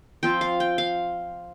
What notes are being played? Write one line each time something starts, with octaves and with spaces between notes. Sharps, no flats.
F3 C4 F4 G5
F5
G5
F5